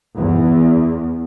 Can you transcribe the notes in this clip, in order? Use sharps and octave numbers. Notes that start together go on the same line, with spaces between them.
E2